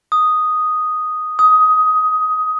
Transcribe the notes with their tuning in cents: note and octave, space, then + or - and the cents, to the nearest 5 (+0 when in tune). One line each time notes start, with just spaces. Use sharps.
D#6 +0
D#6 +15